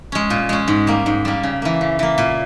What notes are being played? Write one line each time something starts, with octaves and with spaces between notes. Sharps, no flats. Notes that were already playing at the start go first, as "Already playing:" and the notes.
G#3 C#4
A#2
G#3 C#4
G#2
G3 A#3
G#2
G3 A#3
C#3
E3 A#3
C#3
E3 A#3
A#2